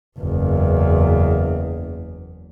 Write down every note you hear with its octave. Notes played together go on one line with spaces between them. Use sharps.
F#1 E2